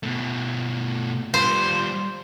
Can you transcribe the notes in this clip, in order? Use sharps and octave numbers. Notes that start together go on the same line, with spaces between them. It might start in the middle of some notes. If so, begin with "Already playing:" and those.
B2 A3
G3 F4 C5